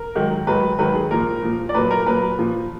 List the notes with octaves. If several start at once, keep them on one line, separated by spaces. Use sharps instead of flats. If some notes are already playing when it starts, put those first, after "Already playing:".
Already playing: A#4
G#2 D#3 F#3
G#2 D#3 F#3 B4
G#2 D#3 F#3 B4
G#4
A#2 F3 A#4
A#2 F3
D5
A#2 F#3 B4
A#4
A#2 F#3 B4
A#2 F3